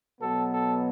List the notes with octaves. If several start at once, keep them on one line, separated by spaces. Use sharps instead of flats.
B2 F#3 B3 A4
A4